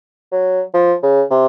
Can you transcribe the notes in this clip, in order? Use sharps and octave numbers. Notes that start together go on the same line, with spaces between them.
F#3
F3
C#3
C3